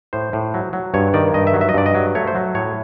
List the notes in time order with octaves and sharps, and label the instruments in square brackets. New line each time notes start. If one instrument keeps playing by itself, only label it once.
[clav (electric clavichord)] A2 C5
A2
F#3
F#3
G2 C#5
D#3 D5
G2 D#5
E5
F#3
E5
D#5
G2 D5
D#5
F#3
A3 C#5
C5
F#3
A2 C#5